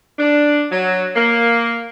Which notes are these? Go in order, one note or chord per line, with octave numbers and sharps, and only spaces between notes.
D4
F#3
A#3